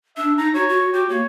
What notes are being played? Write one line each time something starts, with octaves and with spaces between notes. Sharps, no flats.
D4 E5
D#4 A#5
F#4 C#5
F#4
F#4 G4
A#3 C#5